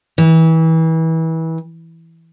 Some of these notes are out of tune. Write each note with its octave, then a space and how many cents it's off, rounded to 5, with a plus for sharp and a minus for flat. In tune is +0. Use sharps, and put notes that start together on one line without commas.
E3 -30